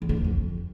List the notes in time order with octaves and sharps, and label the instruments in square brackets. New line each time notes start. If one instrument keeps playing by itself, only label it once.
[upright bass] E2
D3
F#2
F2